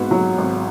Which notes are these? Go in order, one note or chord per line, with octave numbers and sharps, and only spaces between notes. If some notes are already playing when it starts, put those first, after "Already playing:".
Already playing: G#2 B3 F#4
F#3
G#1